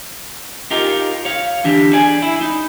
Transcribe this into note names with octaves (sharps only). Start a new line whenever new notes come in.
D#4 F4 G4 A#4
C#5 F5
D3 E3 D4 G4
D4 G#4 D5 G#5
E4
D#4